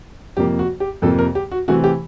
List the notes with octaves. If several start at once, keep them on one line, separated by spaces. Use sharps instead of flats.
F2 C3 F3 A#3 G4
F#4
G4
F2 C3 F3 A#3 A4
A#4
G4
F#4
C3 E3 A3 C4 F#4
G4